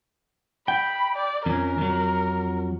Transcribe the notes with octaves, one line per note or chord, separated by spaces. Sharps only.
G5 B5
D5
F2 C#4 A#4
F2 F#3